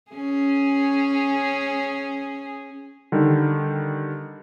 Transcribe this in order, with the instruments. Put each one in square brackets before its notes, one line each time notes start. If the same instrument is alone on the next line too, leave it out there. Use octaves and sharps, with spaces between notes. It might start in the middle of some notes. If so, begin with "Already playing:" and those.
[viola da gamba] C#4 G#4
[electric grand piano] D3 D#3 G3